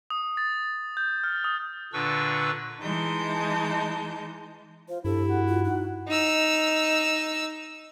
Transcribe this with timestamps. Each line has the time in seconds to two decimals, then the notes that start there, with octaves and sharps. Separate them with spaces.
0.10 D#6
0.37 A6
0.97 G6
1.24 F6
1.44 D#6
1.93 A#2 D3 D4 B4 C#6 E6
2.81 E3 G#3 D#4 A5 G6
4.88 F4 C5
5.05 G2 E4 G4 A4
5.28 F#4
5.47 F4
5.64 D#4
6.08 D#4 E6